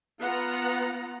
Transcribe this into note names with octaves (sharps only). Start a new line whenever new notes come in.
B3 F4 F#5 A#5